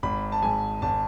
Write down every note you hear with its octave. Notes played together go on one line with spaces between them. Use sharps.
G#1 B5
A5
G#2 G#5
G#1 A5